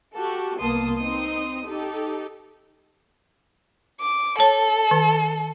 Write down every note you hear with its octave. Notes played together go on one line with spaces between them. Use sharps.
F#4 G4 A4
C2 A#3 B3 A5 C6 D#6
C4 D#4 C6 D#6
D#4 G4 A4
D6
A4 C#5 A5
D#3